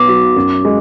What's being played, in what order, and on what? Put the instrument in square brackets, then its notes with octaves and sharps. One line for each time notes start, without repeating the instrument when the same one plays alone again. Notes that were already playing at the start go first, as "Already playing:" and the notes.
Already playing: [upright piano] B1 B3 [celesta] D6
[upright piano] F#3
F#2
G#3